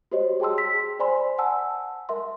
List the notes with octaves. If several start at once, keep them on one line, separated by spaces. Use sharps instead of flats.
F#4 G4 C5 C#5 D#5
G#4 G5 A5 C6 E6
B6
C5 D5 G#5 B5 C6
F#5 G#5 A5 E6
A#4 E5 C6